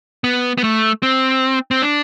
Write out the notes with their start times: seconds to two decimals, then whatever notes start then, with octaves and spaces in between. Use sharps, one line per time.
0.24 B3
0.58 B3
0.64 A3
1.03 C4
1.71 C4
1.82 D4